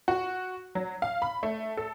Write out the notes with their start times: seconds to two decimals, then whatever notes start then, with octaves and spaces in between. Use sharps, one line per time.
0.08 F#4
0.75 F#3
1.02 F5
1.22 B5
1.43 A3
1.77 A4